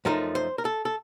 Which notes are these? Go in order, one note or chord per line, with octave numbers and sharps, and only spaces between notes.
F#2 F3 A3 D#4 A#4
C5
A#4
A4
A4